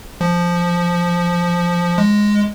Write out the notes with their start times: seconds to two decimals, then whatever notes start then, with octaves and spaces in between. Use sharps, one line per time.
0.21 F3
1.98 G#3